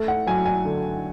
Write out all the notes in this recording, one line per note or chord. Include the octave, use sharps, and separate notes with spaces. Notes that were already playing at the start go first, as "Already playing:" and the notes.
Already playing: A3
F#5
F#3 G#5
G#5
D3